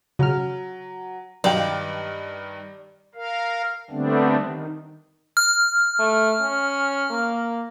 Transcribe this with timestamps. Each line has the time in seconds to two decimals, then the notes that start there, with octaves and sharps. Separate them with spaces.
0.19 C#3 F#3 F6
1.44 G2 D#3 F#3 C5 D5 D#5 F5 G5
3.15 A#4 F5
3.91 D3 G3 A3 B3 C4 D4
4.37 D#3
5.37 F6
5.99 A3
6.41 C#4
7.10 A#3